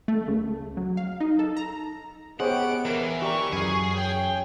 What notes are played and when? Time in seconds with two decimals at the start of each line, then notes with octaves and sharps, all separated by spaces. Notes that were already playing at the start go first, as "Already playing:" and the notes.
0.08 A3
0.28 C#2
0.77 F#3
0.97 F5
1.20 D#4
1.39 A4
1.57 A#5
2.40 B3 G4 G#4 C5 C#5 D#5 F#5 D7
2.85 E3 A#4
3.22 G4 A#4 D5 A#5 C#6
3.52 F#2 G#4 G#5
3.94 C#5 G5